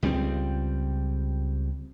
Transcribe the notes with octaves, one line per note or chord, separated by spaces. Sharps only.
C#2 G3 A3 C4